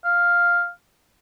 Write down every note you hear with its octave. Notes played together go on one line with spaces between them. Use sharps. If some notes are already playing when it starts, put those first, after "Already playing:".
F5